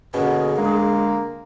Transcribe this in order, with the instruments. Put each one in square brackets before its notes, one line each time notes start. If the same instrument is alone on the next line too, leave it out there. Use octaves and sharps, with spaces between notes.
[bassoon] B2 [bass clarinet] D3 [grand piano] A#3 C#4 [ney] G#4
[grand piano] D3 [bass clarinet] G#3 [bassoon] A#3